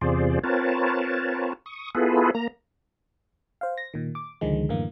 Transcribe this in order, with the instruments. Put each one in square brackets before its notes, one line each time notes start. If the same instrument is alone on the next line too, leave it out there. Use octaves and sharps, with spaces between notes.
[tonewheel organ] E2 C3 F4 G#4 C5 D5
C4 F4 A#4 B4 C#5 A5
C#6 D#6
B3 E4 F4 G#4 A4 B4
A#3 A#5
[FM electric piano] C5 F5
A#6
A#2 D#3
D6
C#2 D3 D#3 F3 G#3
F#2 A2 D3 E3 A#3